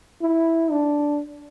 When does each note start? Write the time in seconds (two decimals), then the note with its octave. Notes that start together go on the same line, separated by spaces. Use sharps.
0.22 E4
0.71 D4